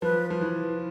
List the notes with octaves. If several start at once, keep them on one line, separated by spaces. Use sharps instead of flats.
F3 B4
F3
E3